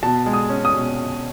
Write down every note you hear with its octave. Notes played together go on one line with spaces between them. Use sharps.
B2 A5
G#3
D#6
C#4
D#6
B2